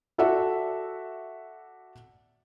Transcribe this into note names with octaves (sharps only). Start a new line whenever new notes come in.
F#4 A4 D5 E5 F#5